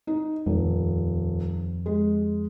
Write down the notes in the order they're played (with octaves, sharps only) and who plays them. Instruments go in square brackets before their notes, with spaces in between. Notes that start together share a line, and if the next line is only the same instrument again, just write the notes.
[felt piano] D#4
[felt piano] D#1 [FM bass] F2
[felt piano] G#3